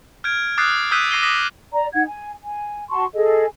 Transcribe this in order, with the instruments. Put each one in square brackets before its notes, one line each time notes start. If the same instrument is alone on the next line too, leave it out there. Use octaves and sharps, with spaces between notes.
[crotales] F6 G6 G#6 D7
D6 D#6 F6 F#6 A6 C7
D#6 E6 F#6 G6 B6 D#7
D6 A#6 C7 D#7 G7
D6 D#6 A#6 B6 E7 F#7
[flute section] D5 A#5
D#4 F#5 G#6
G#5
G#5
F#4 A5 C6 C#6
G#4 A4 D#5